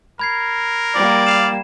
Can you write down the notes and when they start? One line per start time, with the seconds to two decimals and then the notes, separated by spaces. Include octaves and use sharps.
0.19 A#4 B5 G#6 C7
0.95 G3 A#3 D5
1.27 F5 E7